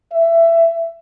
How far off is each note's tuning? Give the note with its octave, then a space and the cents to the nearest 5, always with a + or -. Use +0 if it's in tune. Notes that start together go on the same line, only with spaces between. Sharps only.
E5 +15